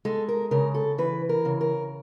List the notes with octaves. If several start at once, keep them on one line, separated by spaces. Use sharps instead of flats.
G#3 A4
A#4
C#3 A#4
A4
E3 B4
A#4
C#3
A#4